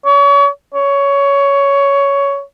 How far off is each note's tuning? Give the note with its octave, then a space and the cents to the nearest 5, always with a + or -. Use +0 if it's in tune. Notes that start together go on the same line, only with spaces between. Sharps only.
C#5 +35
C#5 +15